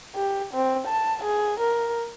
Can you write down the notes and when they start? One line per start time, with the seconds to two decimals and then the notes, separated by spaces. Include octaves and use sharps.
0.15 G4
0.54 C4
0.88 A5
1.24 G#4
1.60 A#4